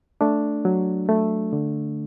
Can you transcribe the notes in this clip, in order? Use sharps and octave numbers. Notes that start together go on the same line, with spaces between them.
A3 D4
F#3
A3
D3